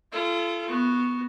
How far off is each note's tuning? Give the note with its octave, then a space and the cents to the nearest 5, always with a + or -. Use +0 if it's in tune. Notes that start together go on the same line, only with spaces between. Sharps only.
F4 -35 A4 -20
B3 +0 F#4 +0